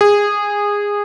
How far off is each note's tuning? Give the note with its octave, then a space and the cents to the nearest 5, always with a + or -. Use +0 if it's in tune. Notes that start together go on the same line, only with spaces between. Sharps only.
G#4 -20